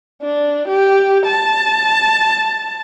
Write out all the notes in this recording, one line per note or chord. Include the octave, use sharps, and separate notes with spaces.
D4
G4
A5